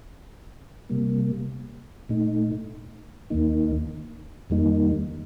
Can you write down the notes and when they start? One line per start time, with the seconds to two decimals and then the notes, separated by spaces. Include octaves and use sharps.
0.90 C3 G3 A#3
2.09 A#2 A3 D#4
3.30 D#2 D#3 A#3 D#4
4.50 F2 D#3 G3 A#3 D#4